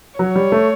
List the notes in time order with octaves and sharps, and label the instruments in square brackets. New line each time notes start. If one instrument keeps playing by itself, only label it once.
[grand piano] F#3 [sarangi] C#5
[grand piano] G3
A3